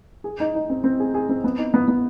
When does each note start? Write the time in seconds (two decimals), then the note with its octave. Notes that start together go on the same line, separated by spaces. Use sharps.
0.24 G#4
0.40 D#4
0.55 D#4
0.70 C4
0.84 C4
1.00 G#4
1.14 G#4
1.29 C4
1.44 B3
1.58 D#4
1.74 B3
1.88 B3